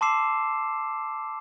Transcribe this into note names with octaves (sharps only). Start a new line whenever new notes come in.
A5 C6 D6 E6 C7 E7